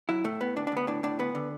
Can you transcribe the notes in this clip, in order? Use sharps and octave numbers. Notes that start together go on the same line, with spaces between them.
F#3 E4
A2 A3
A2 B3
D2 D4
D4
D2 B3
A2 D4
A2 D4
D2 B3
D3